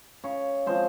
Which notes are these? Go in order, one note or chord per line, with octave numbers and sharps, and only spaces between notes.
C#3 C#5
F3 G#3 C4 C5